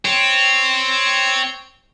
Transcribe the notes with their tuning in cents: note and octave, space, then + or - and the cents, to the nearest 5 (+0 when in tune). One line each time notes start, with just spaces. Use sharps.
C4 +0 C#5 +0